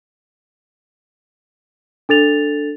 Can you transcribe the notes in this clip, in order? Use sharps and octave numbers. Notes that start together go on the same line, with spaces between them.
D4 A4 A6 F7